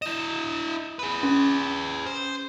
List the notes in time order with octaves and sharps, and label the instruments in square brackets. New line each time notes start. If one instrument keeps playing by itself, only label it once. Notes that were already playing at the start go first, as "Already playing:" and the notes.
[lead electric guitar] E4 D#5 [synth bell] E7
[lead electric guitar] G#4 B4
[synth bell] C#4
[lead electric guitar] C5